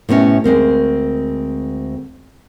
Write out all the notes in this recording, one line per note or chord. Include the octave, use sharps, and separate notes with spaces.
A2 C3 B3 C#4 D#5
D2 G#3 C4 A#4